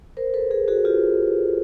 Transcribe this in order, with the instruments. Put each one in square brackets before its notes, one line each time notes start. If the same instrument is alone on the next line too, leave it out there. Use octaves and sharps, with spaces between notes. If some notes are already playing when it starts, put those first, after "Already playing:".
[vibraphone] A#4 C5
A4 B4
G#4 A#4
F#4 G#4
F4 G4